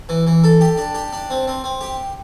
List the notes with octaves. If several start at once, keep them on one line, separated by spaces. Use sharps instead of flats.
E3
E3
A4
G4
D4
G4
D4
C4
C4
C4
G4